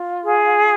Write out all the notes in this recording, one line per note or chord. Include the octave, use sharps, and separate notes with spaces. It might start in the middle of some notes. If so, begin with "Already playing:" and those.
Already playing: F4
G#4